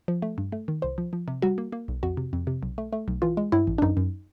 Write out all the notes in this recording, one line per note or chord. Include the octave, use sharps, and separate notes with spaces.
F3
A3
G2
A3
D#3
C2 C5
F3
F3
C3
G3 F#4
A#3
A#3
B1
F2 F#4
C3
F2
C3
B1
A3
A3
B1
E3 F4
G#3
G2 E4
A1
D4
F#2 D#4
F#2